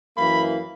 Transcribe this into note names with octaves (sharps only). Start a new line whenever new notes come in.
F#2 E3 A#3 B5